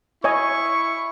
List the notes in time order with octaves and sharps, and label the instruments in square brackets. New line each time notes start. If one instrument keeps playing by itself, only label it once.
[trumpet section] E4 C#6 [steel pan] C#5 D#5 G#5